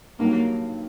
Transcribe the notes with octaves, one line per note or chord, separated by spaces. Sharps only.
G2 D#3 F#3 A#3